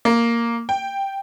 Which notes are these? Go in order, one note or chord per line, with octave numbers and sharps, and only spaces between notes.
A#3
G5